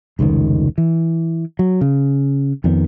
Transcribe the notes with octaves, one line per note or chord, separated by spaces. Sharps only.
F1 C#2 G#2 D#3
E3
F#3
C#3
F2 D#3 B3